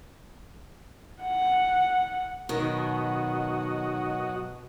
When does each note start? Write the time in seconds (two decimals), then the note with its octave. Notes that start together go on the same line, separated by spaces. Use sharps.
1.23 F#5
2.49 B2 D#3 F#3 F#4 D#5